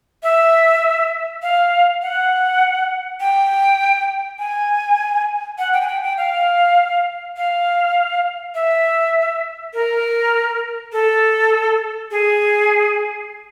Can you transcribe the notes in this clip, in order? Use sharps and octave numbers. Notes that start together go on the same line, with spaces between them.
E5
F5
F#5
G5
G#5
F#5
G5
G#5
G5
G5
F5
F5
E5
A#4
A4
G#4